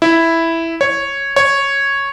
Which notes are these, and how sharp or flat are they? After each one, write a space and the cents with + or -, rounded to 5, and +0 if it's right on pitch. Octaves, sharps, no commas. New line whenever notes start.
E4 +0
C#5 -5
C#5 -5